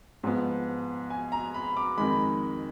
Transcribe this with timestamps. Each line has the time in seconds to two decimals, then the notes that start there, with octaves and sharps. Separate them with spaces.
0.23 G#2 F3 B3
1.10 G#5
1.32 A#5
1.54 B5
1.77 D6
1.98 F2 D#3 G#3 B5